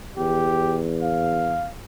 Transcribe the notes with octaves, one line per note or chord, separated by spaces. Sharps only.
E2 G4
F5